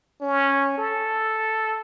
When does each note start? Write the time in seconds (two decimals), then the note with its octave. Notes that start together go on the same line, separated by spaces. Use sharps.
0.22 C#4
0.78 A4